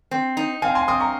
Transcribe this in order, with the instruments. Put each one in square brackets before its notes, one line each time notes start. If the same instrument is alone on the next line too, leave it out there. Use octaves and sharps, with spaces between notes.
[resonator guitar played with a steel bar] C4
D#4
[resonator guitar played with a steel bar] C4 [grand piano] F5 G#5
[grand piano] G#5 C6
[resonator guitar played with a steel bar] C4 [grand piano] C6 D#6
[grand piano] A#5 C#6